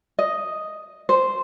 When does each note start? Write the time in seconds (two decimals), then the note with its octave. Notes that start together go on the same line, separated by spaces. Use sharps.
0.19 D#5
1.09 C5